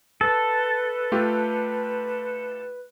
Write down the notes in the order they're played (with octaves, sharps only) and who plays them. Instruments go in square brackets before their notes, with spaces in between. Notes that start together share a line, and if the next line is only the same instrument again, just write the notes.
[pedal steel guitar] A4 [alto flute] B4
[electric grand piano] A3 F4 G4